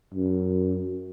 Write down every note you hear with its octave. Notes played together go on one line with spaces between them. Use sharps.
F#2